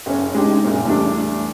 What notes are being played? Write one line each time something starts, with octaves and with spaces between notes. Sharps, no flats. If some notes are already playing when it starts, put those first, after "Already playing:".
F#1 C#4
G#3 D4 D#4 G4
F#1 A#2 C#4
E2 A2 G3 D4